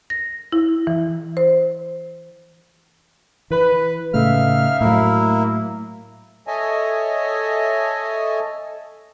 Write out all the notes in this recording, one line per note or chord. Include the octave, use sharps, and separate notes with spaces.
A#6
E4
E3
C5
E3 B4
A2 C#3 A3 D#4 E5 F5 F6
A2 F#3 A#3 E4
A4 C#5 D#5 E5 G#5 A5